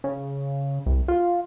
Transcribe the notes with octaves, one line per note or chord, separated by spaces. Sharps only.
C#3
C2
F4